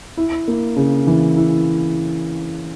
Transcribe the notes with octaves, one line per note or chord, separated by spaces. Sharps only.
E4
A#3
C#3
E3
E4